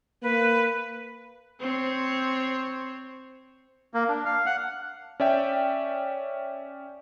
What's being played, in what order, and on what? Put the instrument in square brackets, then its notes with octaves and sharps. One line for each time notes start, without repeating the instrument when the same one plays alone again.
[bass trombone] A#3 [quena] B4
[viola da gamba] C4 C5 C#5
[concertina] A#3
D4
F5
F#5
[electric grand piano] C#4 D5 E5 G5